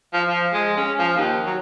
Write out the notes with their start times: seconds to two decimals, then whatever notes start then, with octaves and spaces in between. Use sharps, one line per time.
0.13 F3
0.28 F3
0.53 G#3
0.77 C#4
0.99 F3
1.17 D#2
1.45 F#3